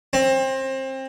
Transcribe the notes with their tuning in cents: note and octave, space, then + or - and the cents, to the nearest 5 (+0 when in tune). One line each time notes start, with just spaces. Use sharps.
C4 +25